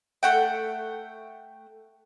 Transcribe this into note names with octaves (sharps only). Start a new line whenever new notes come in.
A3 F#5 G5